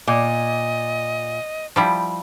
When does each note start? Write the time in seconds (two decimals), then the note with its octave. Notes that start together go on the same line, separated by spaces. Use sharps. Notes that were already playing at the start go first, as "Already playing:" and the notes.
0.07 A#2 D#5
1.76 F3 G3 E4